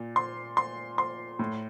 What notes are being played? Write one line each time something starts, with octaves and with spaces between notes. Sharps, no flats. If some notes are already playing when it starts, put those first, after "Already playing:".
Already playing: A#2
C6
C6
C6
A2